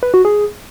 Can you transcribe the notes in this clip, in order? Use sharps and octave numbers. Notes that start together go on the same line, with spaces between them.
B4
F#4
G#4